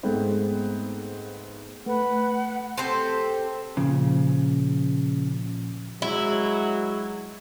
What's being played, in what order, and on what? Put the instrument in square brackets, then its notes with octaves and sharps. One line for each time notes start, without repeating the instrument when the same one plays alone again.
[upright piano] G#2 G#3 A3 B3 C4 D#4
[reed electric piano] A3 [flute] B4 [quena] F#5
[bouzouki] C4 G4 A4 C5
[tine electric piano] A#2 F3 [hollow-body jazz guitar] C#3
[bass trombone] F#3 [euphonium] G#3 [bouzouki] E4